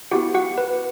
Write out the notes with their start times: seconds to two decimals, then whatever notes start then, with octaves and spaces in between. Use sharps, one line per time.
0.11 B3 E4 F#4 G4 F#5
0.34 F#4 F#5
0.58 B4